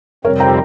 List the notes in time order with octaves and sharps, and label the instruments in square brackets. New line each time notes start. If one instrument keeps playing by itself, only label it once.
[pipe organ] F2 C3 G3 C4 [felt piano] A#4 C#5
[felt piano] G5 A#5